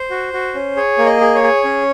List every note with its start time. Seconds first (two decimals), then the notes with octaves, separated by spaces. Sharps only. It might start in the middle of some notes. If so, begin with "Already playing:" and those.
Already playing: C5
0.10 F#4
0.33 F#4
0.55 C#4
0.76 G#4 C#5
0.98 A#3
1.06 D#5
1.21 G#4
1.35 C#5
1.43 G#4
1.64 C#4